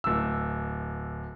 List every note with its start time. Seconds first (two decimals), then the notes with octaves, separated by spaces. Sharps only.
0.04 D1 E6